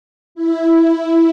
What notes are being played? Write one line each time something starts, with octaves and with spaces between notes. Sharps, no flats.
E4